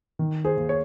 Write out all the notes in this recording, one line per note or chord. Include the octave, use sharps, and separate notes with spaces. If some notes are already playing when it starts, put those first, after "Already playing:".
D#3
G#4 C5
D#2
C#5